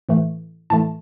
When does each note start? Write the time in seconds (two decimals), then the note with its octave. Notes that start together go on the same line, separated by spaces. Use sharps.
0.09 A2 E3 A3
0.70 A2 E3 A3 A5